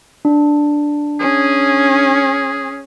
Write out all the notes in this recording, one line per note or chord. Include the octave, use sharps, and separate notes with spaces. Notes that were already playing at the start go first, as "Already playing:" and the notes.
D4
C#4 G#4